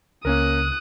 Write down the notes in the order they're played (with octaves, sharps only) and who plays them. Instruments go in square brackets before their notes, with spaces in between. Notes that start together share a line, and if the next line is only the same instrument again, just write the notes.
[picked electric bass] C#2 [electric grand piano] A#3 C#4 A#4 [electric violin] D#6 F#6